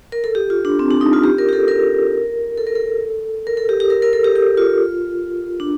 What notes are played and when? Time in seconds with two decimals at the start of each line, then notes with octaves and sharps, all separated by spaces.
0.12 A#4
0.24 A4
0.35 G4
0.50 F4
0.65 D4
0.79 C4
0.91 D4
1.01 D#4
1.13 F4
1.24 G4
1.38 A#4
1.49 G4
1.53 A4
1.68 A#4
2.58 A4
2.67 A#4
2.75 A4
3.47 A#4
3.57 A4
3.69 G4
3.80 G4
3.90 A#4
4.02 A#4
4.13 A4
4.24 G4
4.36 G4
4.57 F4
5.60 D4